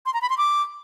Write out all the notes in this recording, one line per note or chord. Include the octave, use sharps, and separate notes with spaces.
C6
A#5
B5
C6
D6